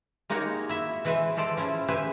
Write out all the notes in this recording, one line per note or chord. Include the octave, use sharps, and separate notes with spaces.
G#3 A#3 D#4 F#4 G4 C#5
E4 E5
E3 G#3 B4 C5 E5
G#3 G4 A4 C5 D5
F3 C#4 E4
G4 G#4 B4 C5 E5